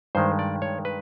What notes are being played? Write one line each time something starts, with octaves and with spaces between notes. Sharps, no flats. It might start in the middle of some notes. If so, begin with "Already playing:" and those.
G2 D#3 G#3 C5
D5
C#5
B4